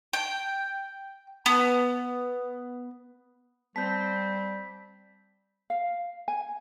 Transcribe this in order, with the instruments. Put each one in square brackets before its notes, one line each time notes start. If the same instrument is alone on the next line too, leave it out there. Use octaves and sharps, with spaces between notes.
[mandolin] G5
B3
[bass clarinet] G3 [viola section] C4 [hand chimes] A5 G6 [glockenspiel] B6
[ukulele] F5
G#5